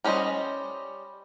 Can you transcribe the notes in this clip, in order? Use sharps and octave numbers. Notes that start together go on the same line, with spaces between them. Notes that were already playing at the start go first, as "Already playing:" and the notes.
G3 C#4 D4 C5 D#5